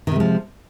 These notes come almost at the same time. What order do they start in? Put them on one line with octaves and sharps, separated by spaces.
D#3 C3 G#3 F3